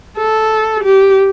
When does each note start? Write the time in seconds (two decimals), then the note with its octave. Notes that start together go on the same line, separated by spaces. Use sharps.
0.18 A4
0.84 G4